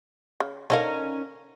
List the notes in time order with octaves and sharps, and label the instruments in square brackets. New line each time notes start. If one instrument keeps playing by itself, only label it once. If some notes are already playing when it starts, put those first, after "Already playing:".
[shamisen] C#3
[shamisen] D3 A4 F5 [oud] C#4 D#4 A#4